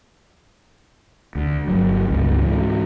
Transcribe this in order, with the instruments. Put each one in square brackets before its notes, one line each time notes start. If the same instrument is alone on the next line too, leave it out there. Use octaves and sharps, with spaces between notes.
[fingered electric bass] D2
G1 F#3
C#2 G2 B2
G#2 E3